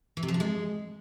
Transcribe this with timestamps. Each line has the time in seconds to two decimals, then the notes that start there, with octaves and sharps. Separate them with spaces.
0.17 E3
0.23 C3
0.28 F3
0.34 D4
0.40 G#3